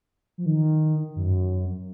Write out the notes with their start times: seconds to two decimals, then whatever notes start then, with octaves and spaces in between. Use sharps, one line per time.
0.38 F3
0.46 D#3
1.16 F#2